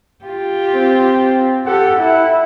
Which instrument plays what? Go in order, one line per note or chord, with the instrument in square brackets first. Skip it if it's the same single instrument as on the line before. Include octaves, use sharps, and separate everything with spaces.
[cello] F4 G4
[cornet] C4
[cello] G4 A4 [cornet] F#5
[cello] E4